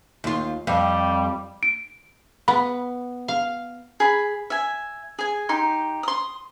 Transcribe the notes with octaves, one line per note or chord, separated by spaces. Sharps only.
D#2 F4
F2 G3
D7
B3 B5
F5
G#4 B5
E5 G#5
G#4 G#5
D#4 G4 C6
C6 D#6